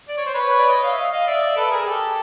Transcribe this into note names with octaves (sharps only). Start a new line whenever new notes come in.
D5
C#5
C5
B4 C#5
D5
C#5 D#5
D#5 F5
E5
D#5 F5
D#5 F5
D5 E5
A4 B4
G#4 A#4
G4 A4